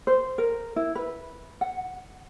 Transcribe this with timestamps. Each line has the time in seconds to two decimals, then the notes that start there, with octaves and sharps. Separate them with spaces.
0.07 C5
0.38 A#4
0.76 E4
0.95 B4
1.61 F#5